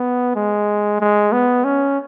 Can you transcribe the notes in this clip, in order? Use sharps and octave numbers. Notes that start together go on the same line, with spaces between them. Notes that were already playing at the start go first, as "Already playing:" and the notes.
Already playing: B3
G#3
G#3
B3
C#4